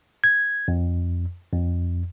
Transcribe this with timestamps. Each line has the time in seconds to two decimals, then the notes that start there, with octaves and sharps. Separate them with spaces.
0.24 G#6
0.68 F2
1.53 F2